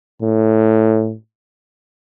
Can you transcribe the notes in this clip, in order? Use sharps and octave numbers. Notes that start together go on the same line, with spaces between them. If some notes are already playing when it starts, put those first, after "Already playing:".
A2